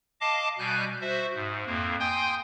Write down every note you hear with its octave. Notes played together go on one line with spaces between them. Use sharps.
D#5 F5 A5 D6
B2 G3 G#5 F#6 G6
F#4 C5 E5
G#2
F2 A#3
G5 G#5 C6 D#6 G6